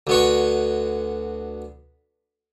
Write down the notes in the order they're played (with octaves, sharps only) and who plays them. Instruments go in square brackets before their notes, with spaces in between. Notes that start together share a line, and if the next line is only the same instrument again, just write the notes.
[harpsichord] D2 B3 C#5